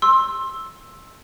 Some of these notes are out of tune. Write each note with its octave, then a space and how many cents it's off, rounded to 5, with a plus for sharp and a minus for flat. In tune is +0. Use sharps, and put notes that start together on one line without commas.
C6 +20 E6 +0